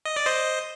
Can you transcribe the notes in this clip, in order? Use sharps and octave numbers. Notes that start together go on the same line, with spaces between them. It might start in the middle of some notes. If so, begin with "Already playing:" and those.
D#5
D5
C5 D#5